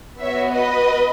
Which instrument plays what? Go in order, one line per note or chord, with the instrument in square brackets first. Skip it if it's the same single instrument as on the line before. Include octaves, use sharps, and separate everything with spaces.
[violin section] B3 F#4 C#5 E5
B4 D#5